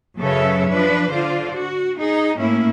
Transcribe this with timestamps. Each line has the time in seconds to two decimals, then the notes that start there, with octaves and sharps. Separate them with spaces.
0.19 F#2 C#3 A4 B4 C#5 E5
0.69 F3 D4 B4
1.11 D3 F4 C5 D5
1.55 F#4
1.98 D#4 G#4
2.38 A2 A3 A#3 C#4 E4